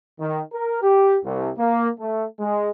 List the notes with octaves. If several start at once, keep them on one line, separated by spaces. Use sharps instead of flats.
D#3
A#4
G4
C2
A#3
A3
G#3